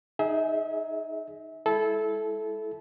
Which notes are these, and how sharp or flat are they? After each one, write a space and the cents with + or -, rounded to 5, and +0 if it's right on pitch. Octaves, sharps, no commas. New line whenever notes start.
D#4 +0 G#4 +10 E5 -30
G#3 -20 E4 +0 A4 -20